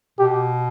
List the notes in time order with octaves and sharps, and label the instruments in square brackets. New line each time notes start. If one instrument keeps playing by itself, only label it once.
[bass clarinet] B2 [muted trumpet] G4